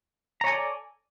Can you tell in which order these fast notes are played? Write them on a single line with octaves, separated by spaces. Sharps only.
A#5 C#5 G#5 A4 D5